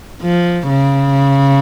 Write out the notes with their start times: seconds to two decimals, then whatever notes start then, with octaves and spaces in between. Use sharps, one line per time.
0.22 F3
0.69 C#3